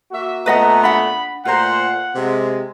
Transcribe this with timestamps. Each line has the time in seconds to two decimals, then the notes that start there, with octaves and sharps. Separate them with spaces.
0.12 A#3 F#4 E5
0.46 A#2 A3 B3 B4 D#5 F#5 A#5
0.84 D4 F#5 B5
1.45 A#2 A3 F4 A#4 C5 F#5
2.15 C3 G#3